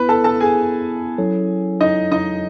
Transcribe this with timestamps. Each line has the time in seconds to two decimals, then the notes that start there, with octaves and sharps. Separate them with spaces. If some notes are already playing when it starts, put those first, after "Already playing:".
Already playing: B3 E4 B4 B5
0.09 A4 A5
0.24 A4 A5
0.40 G#4 G#5
1.18 F#3 C#4 E4 A4 C#5
1.80 D#4 D#5
2.11 D#4 D#5